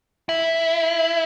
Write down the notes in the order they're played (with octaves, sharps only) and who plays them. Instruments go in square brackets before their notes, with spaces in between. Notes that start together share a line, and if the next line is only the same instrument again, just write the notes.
[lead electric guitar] E4